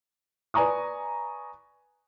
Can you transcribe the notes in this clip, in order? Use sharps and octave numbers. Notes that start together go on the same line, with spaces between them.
B4 D5 G#5 A#5 C#6 D#6